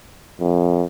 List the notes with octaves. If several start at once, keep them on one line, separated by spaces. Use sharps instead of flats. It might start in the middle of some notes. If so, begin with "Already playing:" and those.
F2